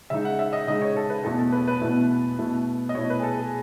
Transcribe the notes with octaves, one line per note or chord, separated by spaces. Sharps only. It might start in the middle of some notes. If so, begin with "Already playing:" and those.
C#3 G#3 D#4 E5
F#5
E5
D#5
C#3 G#3 D#4 D#5
C#5
A4
B4
E2 B2 A3 E4 A4
A4
B4
B4
E2 B2 A3 E4
B2 A3 E4
D#5
B2 A3 E4 C#5
B4
G#4
A4
G#4